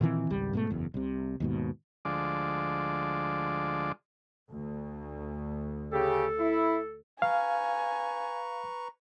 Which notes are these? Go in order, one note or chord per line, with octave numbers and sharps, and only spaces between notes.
A#2 D#3 E3 C4
G#1 C#2 G3
G#2 B2 G3 A3
F#1 E2
C2 C3
D#2 G#2 B2
D2 F3 G#3 D5
D2
C#3 G4 A4
E4
B4 F5 G#5 A#5 C#6